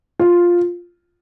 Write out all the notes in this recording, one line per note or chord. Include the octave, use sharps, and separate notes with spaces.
F4